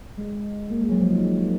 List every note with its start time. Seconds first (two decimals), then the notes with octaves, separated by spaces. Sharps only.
0.18 G#3
0.70 A#3
0.81 G#3
0.90 F#3
1.00 F3
1.10 D#3